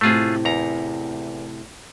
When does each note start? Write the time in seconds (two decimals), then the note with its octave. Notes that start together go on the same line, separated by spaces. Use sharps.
0.01 A2 C3 A3 F4 G#4
0.45 E2 A#5